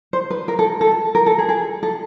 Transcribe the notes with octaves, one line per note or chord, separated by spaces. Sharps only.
C5
B4
A#4
A4
A4
A#4
A4
G#4
G#4
A4